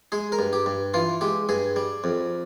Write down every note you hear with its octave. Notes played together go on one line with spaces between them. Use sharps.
G#3 G#4
A#4
G2
G4
G2
E3 F4
G#3 G4
G2 G#4
G3
F2